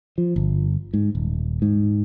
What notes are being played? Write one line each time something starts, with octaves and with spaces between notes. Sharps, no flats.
F3
G1
G#2
D#1
G#2